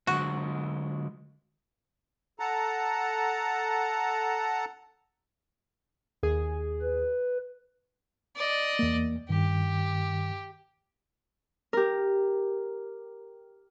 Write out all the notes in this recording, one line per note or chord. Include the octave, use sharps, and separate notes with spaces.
D3 F#3 G#3 F#4
A4 F#5 A5 A#5
D#2 G#4
B4
D5 D#5
E2 A#3
G2 D#3 G4
G4 A#4